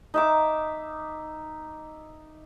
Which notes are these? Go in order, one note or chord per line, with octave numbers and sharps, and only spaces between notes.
D#4 E5 D6